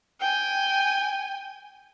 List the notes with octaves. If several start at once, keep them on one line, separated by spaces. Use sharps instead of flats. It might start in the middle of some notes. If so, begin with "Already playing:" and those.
G5 G#5